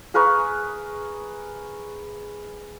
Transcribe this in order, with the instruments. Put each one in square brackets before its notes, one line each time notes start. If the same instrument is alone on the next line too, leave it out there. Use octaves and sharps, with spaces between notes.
[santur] G#4 A#4 B4 C#6